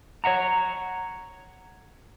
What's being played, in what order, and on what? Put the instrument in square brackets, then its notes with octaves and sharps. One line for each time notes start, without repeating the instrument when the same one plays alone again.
[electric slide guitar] C#5 E5 F#5 A#5